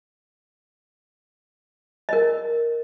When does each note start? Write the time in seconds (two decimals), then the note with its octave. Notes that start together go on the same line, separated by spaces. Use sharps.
2.09 A#4 D#5